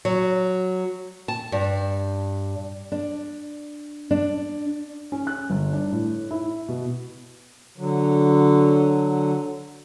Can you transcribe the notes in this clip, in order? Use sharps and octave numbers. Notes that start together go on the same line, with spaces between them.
F#3
A5
G2
D4
D4
C#4
F#6
G1
D4
A2
E4
B2
D3 F#3